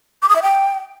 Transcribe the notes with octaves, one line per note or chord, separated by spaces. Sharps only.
D6
D#6
E5
G5